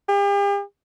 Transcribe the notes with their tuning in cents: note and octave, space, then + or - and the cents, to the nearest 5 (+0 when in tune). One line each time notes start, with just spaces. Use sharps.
G4 +45